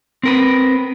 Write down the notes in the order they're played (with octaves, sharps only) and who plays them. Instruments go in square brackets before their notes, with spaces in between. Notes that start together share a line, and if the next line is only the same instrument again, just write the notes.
[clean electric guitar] C4 A#4 B4